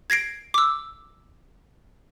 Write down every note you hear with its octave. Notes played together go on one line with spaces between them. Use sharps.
G#6 A#6 C7 D7
D6 E6